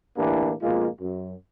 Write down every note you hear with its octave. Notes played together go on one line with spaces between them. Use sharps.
A2 D3 E3 A#3 D4 G4
F2 G#2 B2 G#3 A#3 F4
F#2